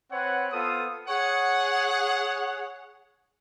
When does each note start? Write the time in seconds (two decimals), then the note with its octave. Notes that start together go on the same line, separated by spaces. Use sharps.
0.11 C4 B4 C#5 F#5
0.52 B3 F4 A4 C5 D#6
1.09 G#4 C#5 F#5